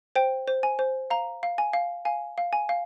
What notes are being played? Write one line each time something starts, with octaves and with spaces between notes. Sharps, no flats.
C5 G5
C5
G#5
C5
F5 A#5
F5
G#5
F5
F5 G#5
F5
G#5
F5